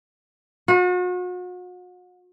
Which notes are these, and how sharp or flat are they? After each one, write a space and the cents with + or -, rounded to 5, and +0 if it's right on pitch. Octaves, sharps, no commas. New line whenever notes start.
F#4 -40